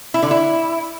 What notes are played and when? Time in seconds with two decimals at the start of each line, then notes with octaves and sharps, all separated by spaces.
0.14 E4
0.23 D3
0.31 E4